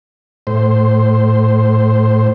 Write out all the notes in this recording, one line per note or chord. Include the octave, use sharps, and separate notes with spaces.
A2 C5